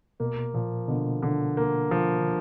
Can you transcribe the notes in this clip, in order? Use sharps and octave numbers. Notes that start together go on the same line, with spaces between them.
B2 A#3
A#2 F3
B2 D3
D3
A#3
F3
D3